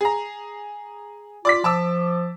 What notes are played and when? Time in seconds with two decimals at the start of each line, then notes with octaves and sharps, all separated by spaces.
0.01 G#4 A#5
1.45 F4 D5 D6 B6
1.64 F3 A5 D6 E6